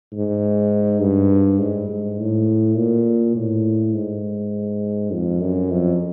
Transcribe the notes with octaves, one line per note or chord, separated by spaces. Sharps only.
G#2
G2
G#2
G#2
A2
A#2
A2
G#2
F2
F#2
F2